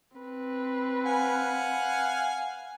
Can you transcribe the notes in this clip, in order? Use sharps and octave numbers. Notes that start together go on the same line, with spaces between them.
C4 B4
F5 F#5 G#5